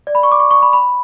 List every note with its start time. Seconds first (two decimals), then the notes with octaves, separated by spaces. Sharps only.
0.07 D5
0.15 B5
0.23 C#6
0.32 D6
0.40 C#6
0.51 C#6
0.62 B5
0.73 B5